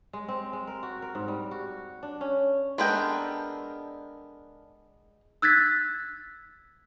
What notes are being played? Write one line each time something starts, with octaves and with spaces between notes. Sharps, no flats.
G#3
C4
G#3
A#4
F#4
A#4
G#2
G3
F#4
D4
C#4
G#3 B3 D4 A4 A#4 G5
E6 F#6 G#6 A6 B6